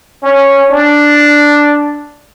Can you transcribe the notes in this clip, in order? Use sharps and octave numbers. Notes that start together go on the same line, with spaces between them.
C#4
D4